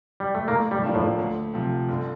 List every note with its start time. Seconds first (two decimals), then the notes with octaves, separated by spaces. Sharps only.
0.20 G3
0.35 A3
0.48 A2 A#3
0.71 G3
0.83 F3 A#3 D4
0.95 A2
1.19 D2
1.53 C3 F3
1.88 G1